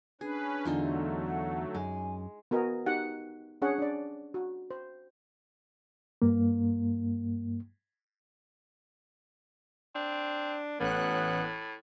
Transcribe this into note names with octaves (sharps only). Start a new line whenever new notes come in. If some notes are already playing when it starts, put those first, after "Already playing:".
C#4 D4 G#4 B4
E2 D3 F#3 A3 D#4 F4
F#5
F#2 G#3 G#5
B3 F#4 A#4 D#5 G#5
D#4 G4 F#5
C#4 D4 G#4 C#5 F#5
D4 D5
F#4
C5
G2 A#3
C4 D4
A1 A2 B3 C#4 F#6